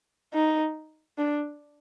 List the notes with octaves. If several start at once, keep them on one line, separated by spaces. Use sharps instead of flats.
D#4
D4